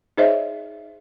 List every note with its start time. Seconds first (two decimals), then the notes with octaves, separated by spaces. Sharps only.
0.17 D#4 G#4 C5 C#5 D#5 E5